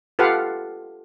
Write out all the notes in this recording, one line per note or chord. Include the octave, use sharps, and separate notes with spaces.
F4 G4 A4 B4 F5 F#5